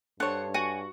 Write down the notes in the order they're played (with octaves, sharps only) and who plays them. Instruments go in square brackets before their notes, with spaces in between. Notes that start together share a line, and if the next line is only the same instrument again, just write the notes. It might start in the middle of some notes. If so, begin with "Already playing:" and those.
[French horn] G2 [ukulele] D4 C5 [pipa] A4 C#5 [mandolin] F#5
[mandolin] F#4 [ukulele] G#5